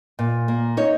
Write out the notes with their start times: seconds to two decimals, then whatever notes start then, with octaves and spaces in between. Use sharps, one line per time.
0.19 A#2
0.48 A#3
0.77 D#4 C#5